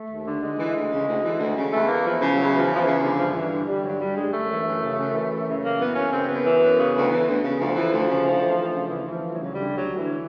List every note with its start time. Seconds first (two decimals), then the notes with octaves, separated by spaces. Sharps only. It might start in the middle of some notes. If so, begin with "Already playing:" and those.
Already playing: A3
0.09 D#2
0.26 D3
0.42 D2 G#3
0.58 E3
0.75 D2
0.91 C#3
1.07 D2
1.24 E3
1.39 D2
1.57 C#3
1.73 E2 A3
1.89 E3 A#3
2.05 E2 F3
2.21 C#3 F3
2.37 E2 F#3
2.54 E3
2.59 F3
2.71 E2
2.76 F3
2.81 E3
2.87 C#3
3.03 D3 F3
3.19 G2 F3
3.36 G2 E3
3.51 D3 E3
3.68 D3 G3
3.84 G2 F#3
4.01 G2 G3
4.17 D3 G#3
4.33 F#2 A3
4.50 E3
4.66 F#2
4.82 C#3
4.98 F#2
5.14 E3
5.32 F#2
5.47 C#3
5.64 F#2 A#3
5.80 E3 B3
5.96 F#2 C#4
6.13 C#3 C4
6.29 F#2 B3
6.46 E3
6.61 F#2
6.78 C#3
6.94 D2
7.10 E3
7.27 D2
7.43 C#3
7.59 D2 F3
7.76 E3
7.92 D2
8.08 C#3
8.24 D2
8.41 E3
8.57 D2
8.73 C#3
8.89 D2 E3
9.06 E3
9.11 F3
9.22 D2
9.33 F#3
9.38 C#3
9.45 F#3
9.55 D3 G3
9.72 D2 F#3
9.88 D2
9.98 D3 E3